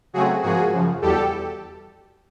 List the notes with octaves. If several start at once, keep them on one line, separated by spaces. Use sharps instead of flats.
C#3 F#3 A3 C4 F#4 G#4
G#2 F3 A#3 F#4 G#4
F#2 C#3 F3
E2 B2 G3 G4 A4